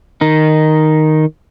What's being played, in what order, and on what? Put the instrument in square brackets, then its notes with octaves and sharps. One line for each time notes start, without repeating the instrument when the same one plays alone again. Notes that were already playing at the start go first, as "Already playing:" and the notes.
[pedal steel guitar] D#3 D#4